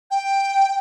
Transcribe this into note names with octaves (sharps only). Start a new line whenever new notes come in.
G5